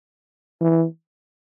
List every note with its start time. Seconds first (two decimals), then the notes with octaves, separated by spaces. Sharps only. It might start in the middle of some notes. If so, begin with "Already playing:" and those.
0.62 E3